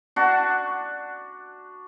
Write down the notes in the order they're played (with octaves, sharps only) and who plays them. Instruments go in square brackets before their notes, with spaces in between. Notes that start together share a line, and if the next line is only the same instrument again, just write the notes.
[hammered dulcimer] D4 F#4